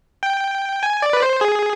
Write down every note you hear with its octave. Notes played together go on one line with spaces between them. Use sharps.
G5
G#5
D5
B4
C5
G#4